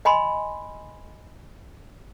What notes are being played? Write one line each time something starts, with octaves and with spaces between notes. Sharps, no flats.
D#5 G#5 B5 C6